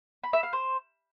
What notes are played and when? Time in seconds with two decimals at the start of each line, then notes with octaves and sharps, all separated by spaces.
0.24 B5
0.33 E5
0.43 F5
0.53 C5